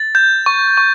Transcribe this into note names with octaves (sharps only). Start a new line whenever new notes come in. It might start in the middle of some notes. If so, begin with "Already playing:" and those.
Already playing: A6
G6
C#6
C#6